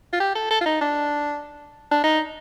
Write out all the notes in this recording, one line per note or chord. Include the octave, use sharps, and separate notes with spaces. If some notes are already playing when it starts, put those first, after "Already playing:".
F4
G4
A4
A4
F4
D#4
D4
D4
D#4